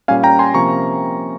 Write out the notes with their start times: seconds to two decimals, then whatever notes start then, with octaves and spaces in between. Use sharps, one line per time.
0.08 A#2 G3 C#4 F5 G#5
0.23 G5 A#5
0.39 G#5 C6
0.54 C3 F3 A#3 C#4 A#5 C#6